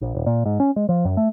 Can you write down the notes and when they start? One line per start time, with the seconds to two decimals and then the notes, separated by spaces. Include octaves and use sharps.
0.01 A#1
0.15 D#1
0.26 A#2
0.46 G#2
0.60 C#4
0.76 G#3
0.89 F3
1.05 F#2
1.17 A3